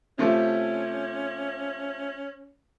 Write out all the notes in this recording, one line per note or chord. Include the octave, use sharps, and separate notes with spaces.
C3 F3 A3 C#4